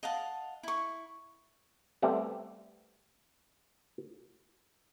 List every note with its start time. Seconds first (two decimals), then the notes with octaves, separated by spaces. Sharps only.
0.03 D#5 F5 F#5 A5
0.63 E4 C#6
2.02 G3 A3 B3 C4